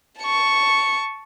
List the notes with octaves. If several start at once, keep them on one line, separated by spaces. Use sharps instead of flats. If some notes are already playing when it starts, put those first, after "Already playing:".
A5 C#6